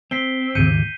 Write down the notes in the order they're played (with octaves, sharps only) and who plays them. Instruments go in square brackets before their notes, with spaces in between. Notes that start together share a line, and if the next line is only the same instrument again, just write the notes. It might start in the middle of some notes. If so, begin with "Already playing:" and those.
[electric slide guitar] C4 [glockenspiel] B6 C7 G7
[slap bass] D#2 G#2 C#3 [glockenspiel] G6 C#7 D#7